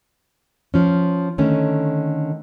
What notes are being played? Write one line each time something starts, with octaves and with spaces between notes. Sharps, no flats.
F3 C#4
D3 D#3 A3 C#4